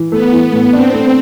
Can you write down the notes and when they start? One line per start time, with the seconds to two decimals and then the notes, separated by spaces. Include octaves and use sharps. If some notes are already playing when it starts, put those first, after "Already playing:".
Already playing: E3
0.12 A3 B3
0.32 E3
0.52 A2
0.73 C4 D4
0.93 A3